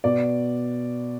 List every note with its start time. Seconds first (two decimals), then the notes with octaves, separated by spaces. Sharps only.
0.04 B2 D5